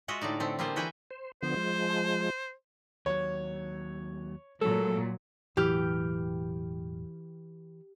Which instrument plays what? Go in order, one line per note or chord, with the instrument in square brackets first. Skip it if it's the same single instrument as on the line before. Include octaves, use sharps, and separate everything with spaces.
[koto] G#3 F4 F#4 D#5 E5
A2 D3 D#4 D5
D3 A3 C4
G3 A#3 F4 G#4 C5
E3 F#4 B4 G5 G#5
[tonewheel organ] C5
[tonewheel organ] D3 F3 B3 [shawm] C5
[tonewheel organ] F3 G#3
[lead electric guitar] D#2 F#3 [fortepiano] C#5
[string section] A#2 F#3 [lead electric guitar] G#3 A3 [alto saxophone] A4
[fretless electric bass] E1 A2 F#3 [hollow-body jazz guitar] E3 [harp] G4 F6 G6